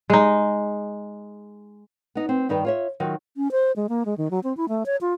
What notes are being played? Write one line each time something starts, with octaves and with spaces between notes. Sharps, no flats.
G#3 D#4
B3 D#4
C4
G2 D#3 D#4 B4 G5
F4 C#5 E5
D#3 F#3 F4 F#4
C#4
C5
G#3
A#3
G#3
D#3
F#3
C4
E4
A3
C#5
F4